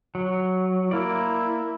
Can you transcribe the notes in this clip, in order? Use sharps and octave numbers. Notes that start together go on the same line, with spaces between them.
F#3
A#3 E4 D5